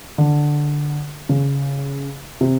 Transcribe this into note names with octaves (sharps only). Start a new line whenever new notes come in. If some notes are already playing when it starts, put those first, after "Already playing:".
D3
C#3
C3